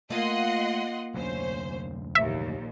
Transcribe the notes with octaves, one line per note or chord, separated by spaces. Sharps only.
A3 A#3 F4 D#5 F#5 C6
F1 D2 F#3 C#4 C5
A#1 D#2 E5